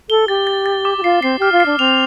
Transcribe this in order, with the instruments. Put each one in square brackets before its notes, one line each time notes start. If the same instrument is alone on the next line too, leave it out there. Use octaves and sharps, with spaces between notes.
[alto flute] A4 [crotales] G7
[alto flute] G4 [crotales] A6
[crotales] A6
A6
D6
[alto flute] G4
[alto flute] F4 [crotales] C7
[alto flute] C4 [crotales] C7
[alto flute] G4 [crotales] F6
[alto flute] F4
[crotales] C7
[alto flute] D4
[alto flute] C4 [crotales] F7